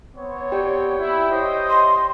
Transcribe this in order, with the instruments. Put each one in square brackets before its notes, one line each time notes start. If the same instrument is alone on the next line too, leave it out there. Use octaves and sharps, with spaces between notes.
[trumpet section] B3 C4 C#5
[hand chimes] G4 D5 [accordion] G5
[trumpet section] E4
C5 C#5 D#5
[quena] C6